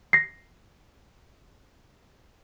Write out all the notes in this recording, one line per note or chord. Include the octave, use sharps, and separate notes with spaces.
A#6 C7